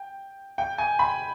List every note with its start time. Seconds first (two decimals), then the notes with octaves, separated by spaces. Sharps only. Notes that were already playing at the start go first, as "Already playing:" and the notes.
Already playing: G5
0.58 G5
0.78 G#5
0.99 B5